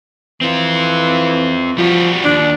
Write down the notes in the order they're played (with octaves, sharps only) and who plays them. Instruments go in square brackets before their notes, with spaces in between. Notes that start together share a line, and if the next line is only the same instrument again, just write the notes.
[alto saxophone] E3 [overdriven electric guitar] C4 F4
[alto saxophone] F3 [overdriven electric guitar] G3 F#4
[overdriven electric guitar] D#2 [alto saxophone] D4